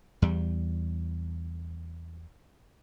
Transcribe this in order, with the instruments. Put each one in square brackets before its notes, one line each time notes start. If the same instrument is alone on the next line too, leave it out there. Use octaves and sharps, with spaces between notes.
[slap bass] E2 G3